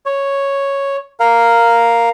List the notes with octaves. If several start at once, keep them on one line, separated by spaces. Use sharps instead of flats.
C#5
A#4 F5